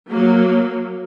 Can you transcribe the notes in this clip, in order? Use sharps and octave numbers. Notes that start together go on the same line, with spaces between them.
F#3 A#3